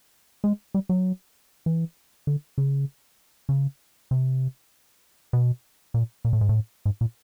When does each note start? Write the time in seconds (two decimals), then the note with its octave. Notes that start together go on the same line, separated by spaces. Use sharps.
0.44 G#3
0.74 G3
0.89 F#3
1.66 E3
2.27 D3
2.58 C#3
3.49 C#3
4.11 C3
5.33 B2
5.94 A#2
6.25 A#2
6.33 A2
6.41 G#2
6.49 A2
6.85 G#2
7.01 A#2